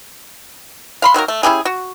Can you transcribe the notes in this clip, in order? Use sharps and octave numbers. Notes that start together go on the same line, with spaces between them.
F5 B5 C6
D#3 F#3 A#3 A#4
A3
C#4 E4 G4 G#4
F#4